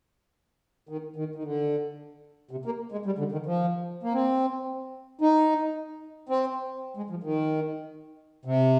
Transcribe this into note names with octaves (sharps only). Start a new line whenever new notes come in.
D#3
D#3
D#3
D3
C3
A#3
G#3
G3
D3
D#3
F3
A#3
C4
D#4
C4
G#3
F3
D#3
C3